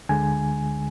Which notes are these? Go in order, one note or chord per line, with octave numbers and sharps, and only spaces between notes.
D2 D3 G#3 G#5